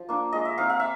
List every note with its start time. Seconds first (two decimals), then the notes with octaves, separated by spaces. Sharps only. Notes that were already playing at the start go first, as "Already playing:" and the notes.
Already playing: F3
0.09 A#3 D4 F4
0.33 G#3 D#5
0.45 E5
0.58 C4 D#4 F5
0.69 F5
0.80 E5